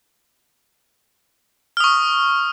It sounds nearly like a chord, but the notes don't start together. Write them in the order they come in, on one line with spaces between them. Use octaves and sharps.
F6 D#6 C#6